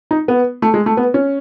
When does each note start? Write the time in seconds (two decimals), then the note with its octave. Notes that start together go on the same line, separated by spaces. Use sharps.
0.11 D#4
0.28 B3
0.62 A3
0.74 G#3
0.86 A3
0.97 B3
1.14 C#4